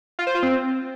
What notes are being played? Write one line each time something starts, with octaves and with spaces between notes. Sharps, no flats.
F4
C5
F4
C4